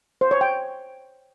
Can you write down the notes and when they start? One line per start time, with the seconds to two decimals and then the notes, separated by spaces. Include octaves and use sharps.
0.21 C5
0.31 C#5
0.41 G5